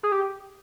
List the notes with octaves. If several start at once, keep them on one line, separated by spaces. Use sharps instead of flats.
G#4
G4